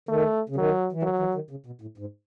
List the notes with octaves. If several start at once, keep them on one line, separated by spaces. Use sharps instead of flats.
D#3 A3
C#3
D#3 F#3
E3
D#3 F#3
E3
D#3
C#3
B2
A2
G#2